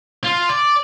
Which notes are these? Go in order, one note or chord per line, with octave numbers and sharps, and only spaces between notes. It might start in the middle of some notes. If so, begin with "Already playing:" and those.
F4
D5